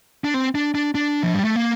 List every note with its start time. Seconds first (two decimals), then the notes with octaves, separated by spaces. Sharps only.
0.24 D4
0.34 C4
0.55 D4
0.75 D4
0.95 D4
1.23 F3
1.34 G3
1.45 A3
1.56 A#3